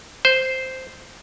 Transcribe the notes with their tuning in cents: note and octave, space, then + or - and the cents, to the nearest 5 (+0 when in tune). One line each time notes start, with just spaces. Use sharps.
C5 -5